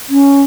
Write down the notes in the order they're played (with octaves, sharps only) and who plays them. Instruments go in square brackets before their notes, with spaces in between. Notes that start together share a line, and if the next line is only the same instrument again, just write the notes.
[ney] C#4